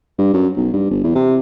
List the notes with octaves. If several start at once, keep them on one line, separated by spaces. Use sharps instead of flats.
G2
F#2
B1
G2
G1
E2
C3